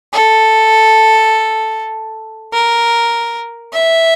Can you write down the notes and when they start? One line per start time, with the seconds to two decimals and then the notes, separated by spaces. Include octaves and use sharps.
0.13 A4
2.53 A#4
3.74 E5